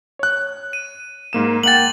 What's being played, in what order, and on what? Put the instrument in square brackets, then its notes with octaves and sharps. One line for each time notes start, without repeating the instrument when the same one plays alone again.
[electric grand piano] C#5 F#6
[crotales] D#7
[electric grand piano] G#2 A#3 E7
[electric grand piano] A#3 F#5 G5 [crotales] A6 F#7